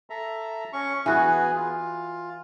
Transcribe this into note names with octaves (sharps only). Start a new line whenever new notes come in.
A4 E5 A#5
C#4 C#6
E3 B3 F#4 G#4
F4